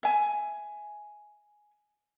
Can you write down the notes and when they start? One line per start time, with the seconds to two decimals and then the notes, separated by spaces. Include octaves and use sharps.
0.03 E5 G#5